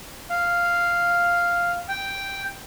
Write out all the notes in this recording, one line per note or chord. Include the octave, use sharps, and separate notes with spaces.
F5
G5